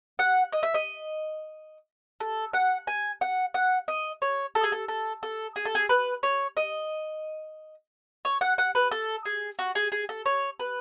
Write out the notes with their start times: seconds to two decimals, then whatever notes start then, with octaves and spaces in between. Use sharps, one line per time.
0.19 F#5
0.52 D#5
0.63 E5
0.74 D#5
2.20 A4
2.53 F#5
2.87 G#5
3.21 F#5
3.54 F#5
3.88 D#5
4.22 C#5
4.55 A4
4.64 G#4
4.72 A4
4.88 A4
5.23 A4
5.56 G#4
5.66 A4
5.75 G#4
5.89 B4
6.23 C#5
6.57 D#5
8.25 C#5
8.41 F#5
8.58 F#5
8.75 B4
8.91 A4
9.25 G#4
9.59 F#4
9.75 G#4
9.92 G#4
10.09 A4
10.26 C#5
10.60 B4